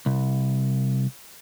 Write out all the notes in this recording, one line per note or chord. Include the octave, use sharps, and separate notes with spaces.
C2